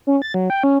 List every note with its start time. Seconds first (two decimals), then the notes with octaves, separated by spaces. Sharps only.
0.07 C#4
0.22 A6
0.34 F#3
0.50 G5
0.64 C#4